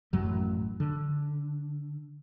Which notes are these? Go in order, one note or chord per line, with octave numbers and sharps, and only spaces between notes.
A1 F#2 F#3 A3
D3